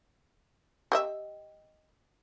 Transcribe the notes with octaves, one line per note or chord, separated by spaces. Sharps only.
G4 D#5 E5